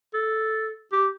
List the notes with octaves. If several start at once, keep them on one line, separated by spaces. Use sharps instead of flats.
A4
G4